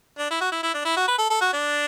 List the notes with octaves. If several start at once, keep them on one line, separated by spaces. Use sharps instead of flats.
D4
E4
F#4
E4
E4
D4
E4
F#4
B4
A4
A4
F#4
D4